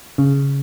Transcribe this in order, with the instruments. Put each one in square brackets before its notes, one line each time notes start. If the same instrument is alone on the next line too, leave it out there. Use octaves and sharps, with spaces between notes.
[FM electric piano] C#3